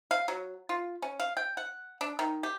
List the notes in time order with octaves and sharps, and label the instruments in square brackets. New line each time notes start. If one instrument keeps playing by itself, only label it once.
[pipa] F5
F#3
F4
C#4
F5
G5
F#5
D4
D#3
G4